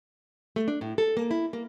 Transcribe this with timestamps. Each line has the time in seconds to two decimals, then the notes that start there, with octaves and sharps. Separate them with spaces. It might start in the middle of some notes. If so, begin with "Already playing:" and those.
0.56 A3
0.68 D4
0.81 A2
0.98 A4
1.17 A#3
1.31 E4
1.53 A#3